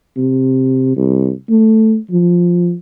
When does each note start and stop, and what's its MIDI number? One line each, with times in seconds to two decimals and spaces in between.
0.16 0.95 48
0.96 1.30 36
1.49 1.97 57
2.11 2.74 53